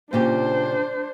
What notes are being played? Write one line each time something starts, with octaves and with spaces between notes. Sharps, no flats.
A#2 C#3 D4 G4 C5